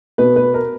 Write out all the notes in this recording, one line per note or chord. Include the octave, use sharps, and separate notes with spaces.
B2 B4
B4
A#4